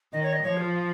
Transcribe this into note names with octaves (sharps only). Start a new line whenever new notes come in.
D#3 D#5
C#5
D#5
F3 C#5
F4